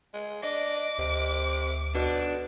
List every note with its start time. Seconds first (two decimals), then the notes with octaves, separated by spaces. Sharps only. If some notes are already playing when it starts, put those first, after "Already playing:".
0.13 G#3
0.43 D4 D#5 D6
0.98 D2 C3
1.95 B2 D4